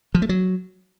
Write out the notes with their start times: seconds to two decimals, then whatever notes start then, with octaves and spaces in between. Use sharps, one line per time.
0.15 F3
0.22 A3
0.29 F#3